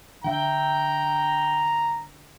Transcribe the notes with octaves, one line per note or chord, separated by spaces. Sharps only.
D3 E5 G5 A#5